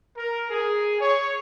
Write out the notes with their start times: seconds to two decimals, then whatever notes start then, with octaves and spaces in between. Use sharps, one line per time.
0.16 A#4
0.50 G#4
1.01 C#5